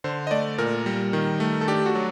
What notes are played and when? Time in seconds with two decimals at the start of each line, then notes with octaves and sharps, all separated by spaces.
0.04 D3 C5
0.27 D#5
0.31 A3 D5
0.58 A#2 A#4
0.86 G3
1.13 D#3
1.40 A3
1.61 A4
1.68 D4 G4
1.86 F#4
1.95 F#3